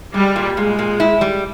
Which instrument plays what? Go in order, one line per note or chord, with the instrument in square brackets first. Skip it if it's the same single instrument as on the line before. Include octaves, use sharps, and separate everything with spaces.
[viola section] G3 [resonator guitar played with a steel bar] G#3
[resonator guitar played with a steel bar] A#2
[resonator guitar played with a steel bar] A#2 [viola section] G#3
[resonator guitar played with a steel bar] A#2
E4
G3